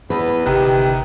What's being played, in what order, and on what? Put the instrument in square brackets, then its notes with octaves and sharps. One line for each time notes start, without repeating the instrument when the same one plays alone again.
[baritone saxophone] E2 [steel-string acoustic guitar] B4
[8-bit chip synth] G1 C3 F#6 [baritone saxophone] D#3 [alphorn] G4